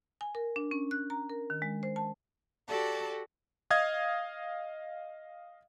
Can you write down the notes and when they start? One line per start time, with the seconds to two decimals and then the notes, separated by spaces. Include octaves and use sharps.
0.21 G#5
0.35 A#4
0.56 D4
0.71 C#4
0.91 F#6
1.10 A#5
1.30 A#4
1.50 D#3
1.62 G#3
1.83 C5
1.96 A5
2.68 F#4 G4 A4 D5 A5
3.71 D#5 F5 D#6 G#6